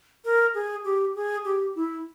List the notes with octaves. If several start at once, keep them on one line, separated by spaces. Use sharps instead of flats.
A#4
G#4
G4
G#4
G4
E4